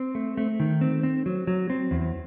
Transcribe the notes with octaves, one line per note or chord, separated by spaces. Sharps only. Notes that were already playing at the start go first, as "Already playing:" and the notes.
Already playing: C4
A3
A3
D#3
C4
C4
F#3
F#3
C4
E2